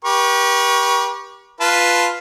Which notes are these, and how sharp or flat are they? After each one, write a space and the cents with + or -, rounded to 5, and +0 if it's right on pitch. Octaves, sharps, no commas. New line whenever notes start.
G4 +0 B4 -45 C#6 +0
F4 +0 B4 +0 A5 -5